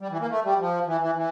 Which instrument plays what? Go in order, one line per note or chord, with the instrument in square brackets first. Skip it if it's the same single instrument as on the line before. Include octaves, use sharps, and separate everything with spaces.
[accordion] G3
E3
A#3
A3
G3
F3
E3
E3
E3